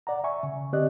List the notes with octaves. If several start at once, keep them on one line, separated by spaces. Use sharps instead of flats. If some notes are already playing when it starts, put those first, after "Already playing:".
D5 F#5 A#5
E5 G#5 C#6
C#3
D3 C4 G4 D5 D#5 F#6